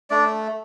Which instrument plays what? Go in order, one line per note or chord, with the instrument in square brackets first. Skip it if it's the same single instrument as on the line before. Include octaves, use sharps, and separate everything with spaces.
[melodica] A3 D4 D5